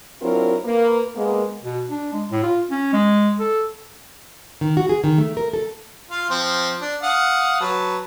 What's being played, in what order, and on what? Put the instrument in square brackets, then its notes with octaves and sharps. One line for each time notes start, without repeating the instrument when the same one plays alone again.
[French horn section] F#3 C4 D4 E4 F4 A#4
A#3 B4
G#3 A#3 B3
[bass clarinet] B2
D4
G#3
A2
F4
C#4
G#3
A4
[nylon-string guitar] D#3
F#4
G#4
D#3
A3
A#4
A4
[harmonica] F4 F5
F3 C4
D4
F5 F#5 D#6
F#3 B4 A5